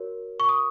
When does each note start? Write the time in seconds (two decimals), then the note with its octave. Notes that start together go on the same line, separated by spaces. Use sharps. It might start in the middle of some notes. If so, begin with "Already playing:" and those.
Already playing: F#4 A#4 C#5
0.40 C#6
0.49 D#6